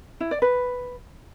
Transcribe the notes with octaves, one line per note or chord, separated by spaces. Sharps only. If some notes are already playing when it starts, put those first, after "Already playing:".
E4
D5
B4